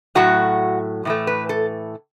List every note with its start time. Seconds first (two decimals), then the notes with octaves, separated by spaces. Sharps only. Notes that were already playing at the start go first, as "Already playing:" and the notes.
0.15 A2 F#3 A3 F#4
1.05 A2 E3 A3
1.27 B4
1.49 A4